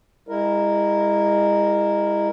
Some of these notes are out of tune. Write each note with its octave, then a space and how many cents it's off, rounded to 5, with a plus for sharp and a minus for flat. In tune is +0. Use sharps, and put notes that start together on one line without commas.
G#3 -35 E4 +0 A#4 +0